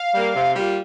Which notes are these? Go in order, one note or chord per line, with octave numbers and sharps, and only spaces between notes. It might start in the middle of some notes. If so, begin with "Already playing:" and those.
Already playing: F5
G3 A#3
C3
G3 A#3 F4